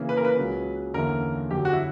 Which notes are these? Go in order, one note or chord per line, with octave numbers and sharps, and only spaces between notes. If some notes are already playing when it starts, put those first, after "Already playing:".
Already playing: C#3 E3 A#3 C#4
B4
A#4
B4
C#2 C#3 F#3 C#4
E2 D3 A#3 C#4 E4 A#4
F#2 D3 F#3 G4
F#4
E4